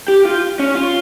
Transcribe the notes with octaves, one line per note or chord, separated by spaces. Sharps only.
G4
F4
C#4
F4